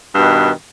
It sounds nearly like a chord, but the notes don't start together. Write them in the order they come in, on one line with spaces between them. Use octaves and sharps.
G2 B2 D#3